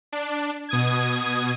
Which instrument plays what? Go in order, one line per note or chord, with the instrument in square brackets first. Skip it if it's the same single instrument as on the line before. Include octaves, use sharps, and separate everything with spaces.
[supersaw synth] D4
B2 D#6 G#6